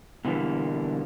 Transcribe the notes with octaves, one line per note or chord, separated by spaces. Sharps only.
B2 D3 E3 G3 A#3